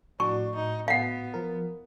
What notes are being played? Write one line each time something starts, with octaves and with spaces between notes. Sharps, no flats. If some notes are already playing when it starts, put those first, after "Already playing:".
A2 D4 F#4 C#6
D#4
B3 F5 F#5
F3 A#4